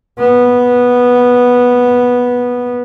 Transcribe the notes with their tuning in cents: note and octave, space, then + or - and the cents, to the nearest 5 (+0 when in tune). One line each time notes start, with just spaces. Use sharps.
B3 -10